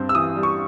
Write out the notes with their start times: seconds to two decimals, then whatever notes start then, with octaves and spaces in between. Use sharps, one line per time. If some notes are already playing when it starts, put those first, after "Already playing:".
Already playing: G2 C4
0.09 E6
0.15 E3 D#6
0.36 G3
0.43 C#6